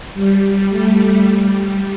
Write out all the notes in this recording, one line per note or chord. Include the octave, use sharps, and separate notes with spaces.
G3
A3
G3